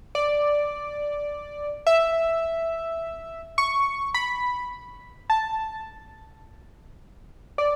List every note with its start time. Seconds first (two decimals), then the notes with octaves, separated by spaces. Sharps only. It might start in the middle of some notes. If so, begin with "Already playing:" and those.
0.15 D5
1.87 E5
3.58 C#6
4.14 B5
5.30 A5
7.58 D5